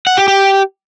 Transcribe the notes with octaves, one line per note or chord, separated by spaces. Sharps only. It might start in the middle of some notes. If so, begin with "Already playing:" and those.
F#5
G4
G4